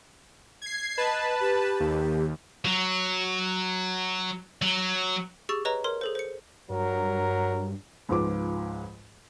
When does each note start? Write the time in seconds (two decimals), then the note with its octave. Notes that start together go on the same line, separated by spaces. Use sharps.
0.62 G#6 C7
0.98 B4 D#5 A5
1.40 G4
1.80 D#2
2.65 F#3
4.62 F#3
5.49 G4 G#4 C#6 E6 A6
5.65 B4 C#5 D#5 A#5
5.84 A#4 C#5 C6
6.01 G#4 A4 C5
6.15 C5 C#7
6.70 G2 F#3 A#4
8.09 C#2 G#2 F3 B4 D6